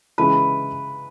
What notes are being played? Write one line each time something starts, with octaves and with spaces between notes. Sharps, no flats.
C#3 E3 G#3 B4